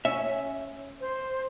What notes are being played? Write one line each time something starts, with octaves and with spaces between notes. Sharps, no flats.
C#4 E5
C5